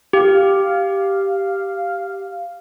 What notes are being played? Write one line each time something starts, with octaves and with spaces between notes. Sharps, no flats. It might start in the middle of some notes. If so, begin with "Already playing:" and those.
G4 F5